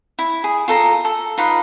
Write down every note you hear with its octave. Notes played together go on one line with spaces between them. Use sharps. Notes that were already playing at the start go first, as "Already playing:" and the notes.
E4
G#4
F4 A4 A#5
A4
D#4 F4 B4